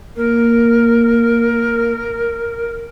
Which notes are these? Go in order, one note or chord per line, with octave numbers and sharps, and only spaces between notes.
A#3 A#4